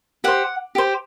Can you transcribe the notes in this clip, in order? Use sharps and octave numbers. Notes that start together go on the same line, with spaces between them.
G4 C5 F#5
G4 C5